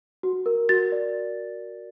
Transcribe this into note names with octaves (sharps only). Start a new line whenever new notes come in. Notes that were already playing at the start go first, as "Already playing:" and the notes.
F#4
A#4
F#4 A6
D5